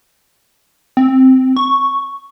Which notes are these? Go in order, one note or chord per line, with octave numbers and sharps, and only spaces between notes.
C4
C#6